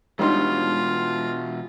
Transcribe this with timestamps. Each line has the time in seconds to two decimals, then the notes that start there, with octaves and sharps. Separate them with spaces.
0.19 B2 E3 G3 G#3 D4 D#4 F4 C6